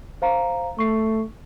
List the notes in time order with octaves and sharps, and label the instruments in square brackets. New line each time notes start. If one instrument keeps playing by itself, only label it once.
[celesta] C5 F5 A#5
[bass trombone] A3 [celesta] C#6 C7